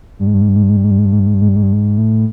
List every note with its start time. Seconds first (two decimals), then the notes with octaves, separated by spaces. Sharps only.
0.19 G2
0.27 G#2
0.34 G2
0.41 G#2
0.48 G2
0.56 G#2
0.63 G2
0.70 G#2
0.76 G2
0.84 G#2
0.91 G2
0.98 G#2
1.05 G2
1.12 G#2
1.19 G2
1.27 G#2
1.34 G2
1.41 G#2
1.48 G2
1.56 G#2
1.63 G2
1.73 G#2
1.98 A2